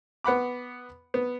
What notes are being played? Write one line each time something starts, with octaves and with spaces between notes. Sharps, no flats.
B3 F#5 B5 D6
B3